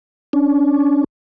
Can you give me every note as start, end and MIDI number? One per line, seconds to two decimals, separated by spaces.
0.33 1.04 61
0.33 1.04 62